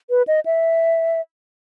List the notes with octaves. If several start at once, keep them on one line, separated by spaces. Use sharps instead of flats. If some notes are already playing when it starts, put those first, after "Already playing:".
B4
D#5
E5